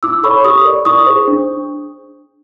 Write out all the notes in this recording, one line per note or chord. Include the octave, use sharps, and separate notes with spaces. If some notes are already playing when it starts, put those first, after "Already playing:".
E4 D6 E6
A4 C#5 B5 C#6
G4 C#6 D#6
A#4 D5
E4 C#6 D#6
G#4 C5
D4